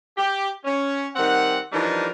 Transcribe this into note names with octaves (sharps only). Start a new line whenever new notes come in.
G4
C#4
D#3 G3 C4 F#5
E3 F3 G3 D4 D#4 A#4